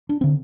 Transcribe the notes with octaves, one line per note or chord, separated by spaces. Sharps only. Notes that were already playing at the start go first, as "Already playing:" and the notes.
D4
D3 C4